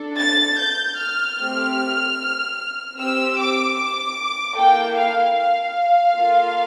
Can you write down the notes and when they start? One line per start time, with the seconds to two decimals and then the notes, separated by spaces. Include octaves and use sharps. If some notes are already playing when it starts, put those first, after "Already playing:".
Already playing: D4 A4
0.19 A6
0.60 G6
1.00 F6
1.38 A3 C4 G4
2.98 C4 G4 E6
3.38 D6
3.78 D6
4.57 A#3 E4 A4 G5
4.97 F5
5.37 F5
6.16 A#3 F4 A4